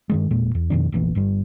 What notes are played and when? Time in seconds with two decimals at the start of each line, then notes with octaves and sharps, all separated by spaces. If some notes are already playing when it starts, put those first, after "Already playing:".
0.09 G2 D#3 G#3
0.31 E1 A#2 G#3
0.55 E2
0.70 F2 B2 D#3 D4
0.92 F1 A#1 E3
1.15 G1 G2 G3